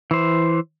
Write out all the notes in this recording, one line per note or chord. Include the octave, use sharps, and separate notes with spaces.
E3 C5